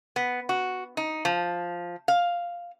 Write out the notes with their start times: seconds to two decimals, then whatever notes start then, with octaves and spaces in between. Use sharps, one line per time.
0.16 B3
0.49 F#4
0.97 D#4
1.25 F3
2.08 F5